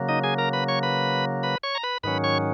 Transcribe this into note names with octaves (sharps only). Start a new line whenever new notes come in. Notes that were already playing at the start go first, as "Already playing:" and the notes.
Already playing: C#3 F#3 A#3
D#4 D#5
G#4 G#5
A#4 A#5
B4 B5
C#5 C#6
B4 B5
B4 B5
C#5 C#6
A#5
B4 B5
G#2 D#3 F#3 C#4 B4 B5
C#5 C#6